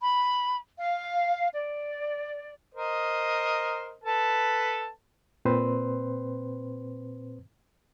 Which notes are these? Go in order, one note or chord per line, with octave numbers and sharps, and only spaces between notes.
B5
F5
D5
A#4 C5 D#5
A4 B4 A5
A#2 C4 B4 C5 C6